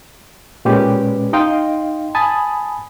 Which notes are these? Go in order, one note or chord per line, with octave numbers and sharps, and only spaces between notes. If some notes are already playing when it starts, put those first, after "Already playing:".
A#2 G#3 C#4 G4 B4
D#4 D#5 F5 G5 C6
G#5 A5 B5 D#6 A6